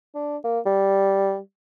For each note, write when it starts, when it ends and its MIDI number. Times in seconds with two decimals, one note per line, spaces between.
0.15 0.37 62
0.44 0.59 58
0.66 1.38 55